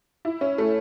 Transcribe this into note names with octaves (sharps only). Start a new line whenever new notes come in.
E4
C#4
A3